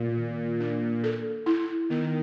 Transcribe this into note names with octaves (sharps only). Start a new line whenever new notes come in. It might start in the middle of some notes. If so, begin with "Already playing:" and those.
Already playing: A#2
D#3
D4
A4
E4
D#3 B3